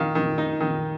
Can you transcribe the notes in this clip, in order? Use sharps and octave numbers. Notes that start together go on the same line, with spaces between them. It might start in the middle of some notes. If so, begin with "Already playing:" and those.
Already playing: D#3 F5
D#3
D#4
D#3